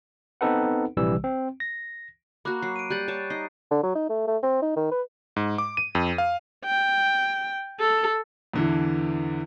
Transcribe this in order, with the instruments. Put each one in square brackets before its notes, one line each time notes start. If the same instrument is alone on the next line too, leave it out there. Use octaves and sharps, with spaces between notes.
[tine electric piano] B3 C4 D#4 A4 B4 F#5
A#1 C3 E3 G3 E6
C4
A#6
[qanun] A#3 F#4 [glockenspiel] B5 D6 F#6
[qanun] F#3 [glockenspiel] C7
[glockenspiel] D7 D#7
[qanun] G3 F#5 [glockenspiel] F#6 G6 A6
[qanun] C#5 A5
[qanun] D#4 [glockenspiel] C7
[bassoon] D3
F#3
D#4
A3
A3
C4
D#4
D#3
B4
[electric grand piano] G#2
D6
D#7
F2
F5
[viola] G5
A4
[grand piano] E2 D3 E3